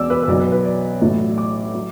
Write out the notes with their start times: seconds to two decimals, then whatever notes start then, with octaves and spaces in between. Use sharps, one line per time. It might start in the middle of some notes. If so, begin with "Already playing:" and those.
Already playing: E1 E2 B2 D5 D6 E6
0.10 B4
0.23 B4
0.27 B1 B2 F#3 D5
0.40 B4
0.52 B4
0.65 D5
1.01 A1 A2 F#3
1.38 D6
1.74 F#3